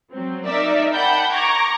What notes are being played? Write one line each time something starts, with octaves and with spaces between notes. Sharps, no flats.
F#3 C4
D#4 A#4 D5 E5
F#5 G5 A5 B5 G6
A#5 C#6 D6 G#6 A#6